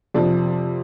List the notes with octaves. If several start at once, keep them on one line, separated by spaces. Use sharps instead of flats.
F2 C3 F3 D5